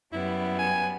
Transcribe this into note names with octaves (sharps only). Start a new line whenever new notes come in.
F#2 G3 B3 E4
G#5